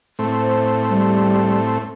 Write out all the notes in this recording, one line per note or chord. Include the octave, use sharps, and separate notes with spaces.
A2 A3 C4
C5
G3